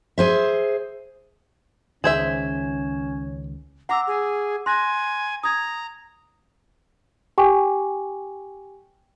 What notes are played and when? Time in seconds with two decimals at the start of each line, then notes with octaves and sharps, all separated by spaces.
0.18 G#4 C5 E5
2.04 C#2 D#3 C#4 G#4 C5 E5 G#6 E7
3.89 F#5 A#5 D6 E6
4.07 G#4
4.66 G#5 C6 F#6 A#6
5.43 A#5 D#6 G#6
7.38 G4 G5 G#5 C#6 D6